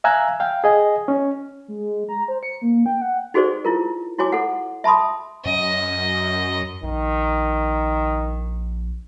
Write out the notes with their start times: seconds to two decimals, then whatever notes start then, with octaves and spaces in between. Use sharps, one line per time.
0.04 E5 F5 G#5 A#5 E6 F#6
0.40 F5 G5
0.64 G#4 D#5 G#5
1.08 C#4
1.68 G#3
2.09 A#5
2.28 C5
2.43 C#7
2.62 A#3
2.86 G5
3.02 F#5
3.34 D#4 F#4 G#4 A4 C5 D5
3.65 E4 F4 A#4
4.18 E4 F#4 C#5 G#5 D6
4.32 A4 F#5
4.84 E5 A5 B5 C6 D#6
5.45 F#2 D#5
6.83 A#1 D#3